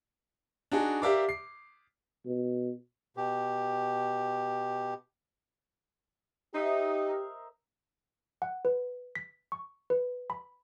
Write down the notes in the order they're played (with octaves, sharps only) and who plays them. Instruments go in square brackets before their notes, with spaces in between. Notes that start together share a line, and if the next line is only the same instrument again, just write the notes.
[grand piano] D4 D#4 F#4 G#4
G4 A#4 D5 E5 F5 D6
C7
[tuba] B2
[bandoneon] B2 G4
[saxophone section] D#4 [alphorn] G4 [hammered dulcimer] C5 D#5 E5
[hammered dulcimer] A#4
[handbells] F#5
B4
B6
C#6
B4
B5